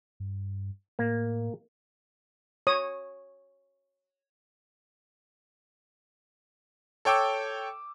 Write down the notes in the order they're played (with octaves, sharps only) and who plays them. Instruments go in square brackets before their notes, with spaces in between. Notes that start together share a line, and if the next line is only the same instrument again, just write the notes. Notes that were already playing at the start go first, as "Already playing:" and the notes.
[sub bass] G2
[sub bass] A2 [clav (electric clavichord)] A#3
[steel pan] C#5 D#6
[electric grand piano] A4 C#5 G5 D6 E6